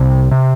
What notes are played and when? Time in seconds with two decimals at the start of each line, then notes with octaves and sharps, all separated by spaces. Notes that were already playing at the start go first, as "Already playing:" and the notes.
Already playing: C2 C3
0.31 C3